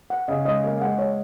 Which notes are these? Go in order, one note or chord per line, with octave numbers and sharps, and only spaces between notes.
F#5
C#3 D#5
G#3 D#5
A#3 D#5
G#3 F#5
C#5